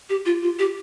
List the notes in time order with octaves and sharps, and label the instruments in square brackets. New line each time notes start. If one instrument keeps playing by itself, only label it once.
[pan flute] G4
F4
F4
G4